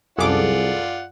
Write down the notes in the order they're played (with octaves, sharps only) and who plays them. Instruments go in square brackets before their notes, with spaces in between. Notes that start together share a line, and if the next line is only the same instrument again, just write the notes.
[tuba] C2 [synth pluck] F#2 D6 [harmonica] F4 D5 F#5 [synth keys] G#4 A4